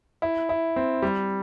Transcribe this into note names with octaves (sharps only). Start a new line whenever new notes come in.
E4
E4
C4
G3